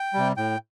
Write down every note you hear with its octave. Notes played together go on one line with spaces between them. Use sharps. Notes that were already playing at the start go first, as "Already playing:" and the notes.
Already playing: G5
C3 G3
A2 G5